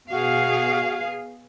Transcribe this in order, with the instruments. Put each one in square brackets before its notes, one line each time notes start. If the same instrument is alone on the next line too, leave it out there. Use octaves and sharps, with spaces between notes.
[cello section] B2 G#4 F5 [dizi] F#4